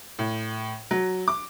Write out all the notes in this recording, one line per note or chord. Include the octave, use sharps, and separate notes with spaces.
A2
F#3
D6